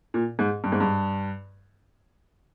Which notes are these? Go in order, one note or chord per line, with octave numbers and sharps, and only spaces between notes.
A#2
G#2
G2
G#2
G2